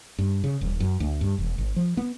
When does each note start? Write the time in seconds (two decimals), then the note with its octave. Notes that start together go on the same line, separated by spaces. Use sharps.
0.18 G2
0.44 C#3
0.61 D#1
0.80 F#2
1.00 D2
1.21 G2
1.38 E1
1.58 G#1
1.76 F3
1.97 B3